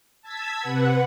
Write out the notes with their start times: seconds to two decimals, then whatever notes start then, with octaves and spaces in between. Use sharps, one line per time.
0.22 A5 E6 G#6 B6
0.60 C3 B4 F#5